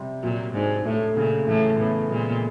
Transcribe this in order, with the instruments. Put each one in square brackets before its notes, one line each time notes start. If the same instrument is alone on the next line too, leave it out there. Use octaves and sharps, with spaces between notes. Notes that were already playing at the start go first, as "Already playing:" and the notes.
Already playing: [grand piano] C3 G3
[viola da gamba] A#2 [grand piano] F#3
[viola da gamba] G#2 [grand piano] D4
[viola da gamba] A2 [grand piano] A3
[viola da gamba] A#2 [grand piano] C#3
[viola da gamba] A2 [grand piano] E3
[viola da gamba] A2 [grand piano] B3
[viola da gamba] A#2 [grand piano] G#3